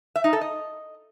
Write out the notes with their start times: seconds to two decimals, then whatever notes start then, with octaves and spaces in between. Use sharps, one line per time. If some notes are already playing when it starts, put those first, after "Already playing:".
0.16 E5
0.24 D#4
0.33 A4
0.41 D#5